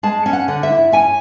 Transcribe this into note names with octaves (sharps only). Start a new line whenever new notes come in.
G#3 A5
C#4
F#5
D3
E5
E4
C#4 G#5